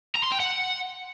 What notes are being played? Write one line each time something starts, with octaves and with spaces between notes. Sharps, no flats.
A#5
C6
G5
F#5